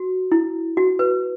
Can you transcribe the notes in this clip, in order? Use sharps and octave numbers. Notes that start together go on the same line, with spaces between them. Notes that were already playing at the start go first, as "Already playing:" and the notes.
Already playing: F#4
E4
F#4
B4